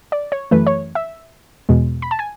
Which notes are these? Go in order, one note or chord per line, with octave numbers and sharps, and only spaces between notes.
D5
C#5
F#2 E3 A3 B4
C#5
E5
E2 B2 G#3
B5
A5
G#5